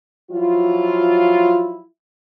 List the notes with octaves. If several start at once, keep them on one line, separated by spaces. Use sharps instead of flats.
F3 F#3 E4 F4